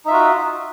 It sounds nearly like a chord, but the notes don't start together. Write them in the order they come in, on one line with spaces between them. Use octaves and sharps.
D#4 E5 F4 F#4